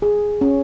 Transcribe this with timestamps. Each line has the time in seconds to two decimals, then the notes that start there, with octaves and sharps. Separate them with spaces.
0.02 G#4
0.41 C#4